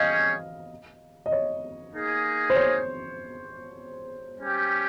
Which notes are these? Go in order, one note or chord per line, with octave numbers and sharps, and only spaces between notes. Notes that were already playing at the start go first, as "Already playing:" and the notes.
Already playing: G3 C#4 G#4 C#5 D#5 F5
D#5
C#5
A#3 D#4 G#4
C5
C#5
G3 C#4 G4